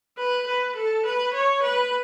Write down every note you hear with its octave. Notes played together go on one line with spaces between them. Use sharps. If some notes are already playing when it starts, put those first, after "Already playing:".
B4
B4
A4
B4
C#5
B4